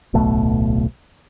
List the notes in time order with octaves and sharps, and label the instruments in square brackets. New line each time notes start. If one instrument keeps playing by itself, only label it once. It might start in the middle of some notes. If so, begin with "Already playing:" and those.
[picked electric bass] D1 B1 B2 A3